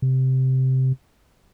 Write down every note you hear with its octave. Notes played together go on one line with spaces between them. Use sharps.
C3